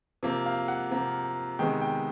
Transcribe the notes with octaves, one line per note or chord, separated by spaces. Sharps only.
C3 F3 A#3
F5
F#5
C3 F3 A#3
C3 D#3 G#3 B3 G5
G5